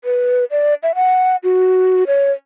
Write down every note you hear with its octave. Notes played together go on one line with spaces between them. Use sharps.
B4
D5
E5
F#5
F#4
C#5